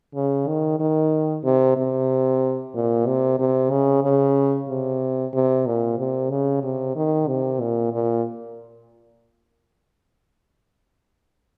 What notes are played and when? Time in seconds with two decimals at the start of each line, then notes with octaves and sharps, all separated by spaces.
0.15 C#3
0.47 D#3
0.80 D#3
1.44 C3
1.77 C3
2.75 A#2
3.07 C3
3.39 C3
3.71 C#3
4.04 C#3
4.69 C3
5.34 C3
5.66 A#2
5.98 C3
6.30 C#3
6.63 C3
6.96 D#3
7.28 C3
7.61 A#2
7.93 A#2